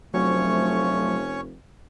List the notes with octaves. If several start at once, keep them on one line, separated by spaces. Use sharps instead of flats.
F1 D3 F3 F#3 A3 C#4 C#5 C#6